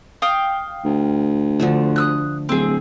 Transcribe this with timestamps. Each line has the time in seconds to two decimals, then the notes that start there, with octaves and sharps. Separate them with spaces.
0.22 F5 G5 D#6
0.85 D2
1.60 D3 F3 A3
1.96 D#6 E6 F#6
2.49 D1 C4 G#4